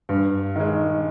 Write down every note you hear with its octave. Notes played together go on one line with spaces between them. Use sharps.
G2
D#3 G#3